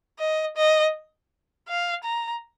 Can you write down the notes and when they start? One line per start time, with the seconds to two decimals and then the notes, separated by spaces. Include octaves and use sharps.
0.19 D#5
0.56 D#5
1.68 F5
2.04 A#5